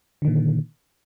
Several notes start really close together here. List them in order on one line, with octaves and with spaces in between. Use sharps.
D3 D#3 A#2